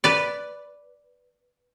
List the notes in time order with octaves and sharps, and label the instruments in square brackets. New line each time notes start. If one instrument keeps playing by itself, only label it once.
[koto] B4 D5